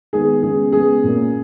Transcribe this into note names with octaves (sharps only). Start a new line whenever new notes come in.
D#3 G#3 B3 G#4
C#3 G#3 B3 G#4
C#3 G#3 B3 G#4
A#2 A#3 C#4